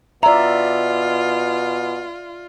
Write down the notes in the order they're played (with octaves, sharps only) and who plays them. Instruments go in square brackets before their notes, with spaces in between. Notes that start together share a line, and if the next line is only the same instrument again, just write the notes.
[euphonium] B2 [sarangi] F4 [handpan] D5 E5 [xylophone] A#5